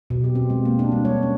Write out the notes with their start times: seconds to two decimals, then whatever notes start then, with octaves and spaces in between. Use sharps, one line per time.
0.10 B2
0.24 G4
0.35 C4
0.50 G#3
0.65 A#3
0.79 D4
0.92 G3
1.05 C#5
1.23 C#4